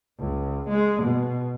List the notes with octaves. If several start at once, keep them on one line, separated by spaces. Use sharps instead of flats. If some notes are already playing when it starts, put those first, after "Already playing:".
C#2
G#3
B2